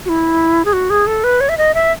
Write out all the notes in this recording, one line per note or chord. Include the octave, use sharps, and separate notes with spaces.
F#4
E4
G#4
F#4
G#4
A4
B4
C#5
E5
D#5
E5